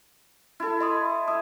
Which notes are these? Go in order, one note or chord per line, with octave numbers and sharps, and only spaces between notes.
E4 A4
D#5 C6 D#6
E5 D#6